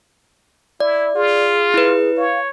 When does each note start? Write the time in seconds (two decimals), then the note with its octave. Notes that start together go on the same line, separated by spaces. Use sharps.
0.80 E4 D5
1.15 F4 G#4
1.74 E4 B4
2.17 C#5 F5